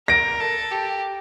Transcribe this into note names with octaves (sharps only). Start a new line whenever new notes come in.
A#4 A#6 D7
A4
G4